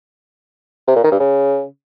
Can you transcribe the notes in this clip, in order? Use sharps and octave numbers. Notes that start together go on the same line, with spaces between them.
C3
A#2
D#3
G2
C#3